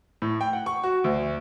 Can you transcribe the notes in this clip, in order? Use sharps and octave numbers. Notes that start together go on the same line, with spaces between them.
A2
G5
F#5
C#6
F#4
D2